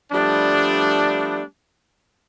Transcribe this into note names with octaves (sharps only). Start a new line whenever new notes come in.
F3 G3 A3 B3 D4